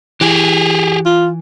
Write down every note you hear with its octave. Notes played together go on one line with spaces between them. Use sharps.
E3 G4 G#4
F4